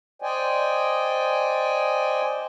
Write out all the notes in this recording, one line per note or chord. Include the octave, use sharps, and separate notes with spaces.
C5 D5 D#5 G5 G#5